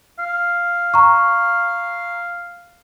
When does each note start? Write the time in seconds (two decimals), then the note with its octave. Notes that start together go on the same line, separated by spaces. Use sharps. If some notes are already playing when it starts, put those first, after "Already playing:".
0.19 F5
0.94 A#5 C#6